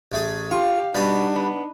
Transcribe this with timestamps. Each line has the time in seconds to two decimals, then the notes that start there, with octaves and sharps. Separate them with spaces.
0.12 A1 A3 G#4
0.51 F4 G4 F5 C#6
0.95 B2 G3 B3 D4 D#4 F#4 D#6
1.36 B3